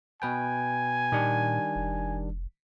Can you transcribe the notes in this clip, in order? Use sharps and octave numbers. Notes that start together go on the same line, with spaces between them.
B2 B4 G5 G#5
A#2 D#3 G3 D4
F1